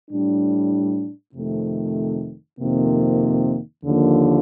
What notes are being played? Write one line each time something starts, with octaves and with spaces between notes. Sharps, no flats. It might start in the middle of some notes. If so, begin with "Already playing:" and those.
A2 G3 D4
F2 C3 D#3 A3
F2 C3 D#3 A#3
D#2 D3 F3 A#3